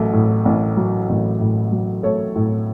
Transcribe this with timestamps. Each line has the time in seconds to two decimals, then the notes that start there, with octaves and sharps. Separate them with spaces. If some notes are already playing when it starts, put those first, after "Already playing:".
Already playing: A1 F#3 A3
0.13 A2
0.45 A1
0.77 F#3
1.09 A1
1.40 A2
1.72 F#3
2.03 A3 A4 C#5
2.36 A2